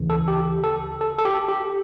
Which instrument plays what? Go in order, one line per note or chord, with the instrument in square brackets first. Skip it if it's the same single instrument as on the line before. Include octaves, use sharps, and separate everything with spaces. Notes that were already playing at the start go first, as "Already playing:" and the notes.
Already playing: [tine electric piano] D2 C#3 E3
A4
G4
A4
A4
A4
G4
G4